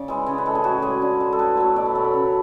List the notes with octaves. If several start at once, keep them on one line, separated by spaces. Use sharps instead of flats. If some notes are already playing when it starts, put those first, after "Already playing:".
Already playing: C#3 D5
E3 G#3
C#3 C#5
B4
G#3 A4
G#4
A2 F#4
G#3 G#4
D3
G#3
A4
A2 B4
F#3 A3 C#5
B2 D5
E5
A3 C#5
B4
C#3